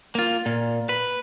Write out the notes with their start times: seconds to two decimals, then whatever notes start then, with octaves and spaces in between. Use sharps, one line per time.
0.15 A#3 F4
0.46 A#2
0.89 B4